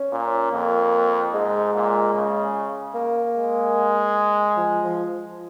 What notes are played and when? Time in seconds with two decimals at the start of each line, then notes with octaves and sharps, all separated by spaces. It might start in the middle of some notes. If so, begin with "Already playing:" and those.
Already playing: C#4
0.12 A#2
0.52 F2 A#3
1.33 G#2 G#3
1.74 A#2
2.14 C#3
2.95 A#3
3.36 G#3
4.57 F3
4.84 F3